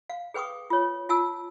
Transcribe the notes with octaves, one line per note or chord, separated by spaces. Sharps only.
F5
G#4 B4 G5 C#6 D#6
F4 C#5
F4 G#5 A5 E6